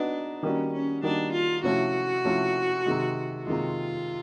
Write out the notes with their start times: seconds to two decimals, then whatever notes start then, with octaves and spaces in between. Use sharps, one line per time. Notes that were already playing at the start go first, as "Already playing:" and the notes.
Already playing: B3 D4 D#4 F#4 B4 D#5
0.43 D#3 G3 A#3 C#4 D#4 F#4
0.73 C#4
1.03 D#3 G3 A#3 D4 D#4 F#4
1.33 F4
1.63 C3 F3 A3 C#4 E4 F#4
2.25 C3 F3 A3 C#4 E4
2.86 C3 D#3 G#3
3.47 C3 D#3 G#3 F4